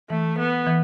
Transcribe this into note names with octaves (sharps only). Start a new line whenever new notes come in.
E3 A3
B3
E3